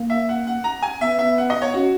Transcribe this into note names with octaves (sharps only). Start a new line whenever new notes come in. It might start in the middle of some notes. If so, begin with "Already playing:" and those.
Already playing: A#3
E5
F#5
F#5
A#5
G#5
B3 E5
E5
F#5
D#5
C#5
C#4 F#4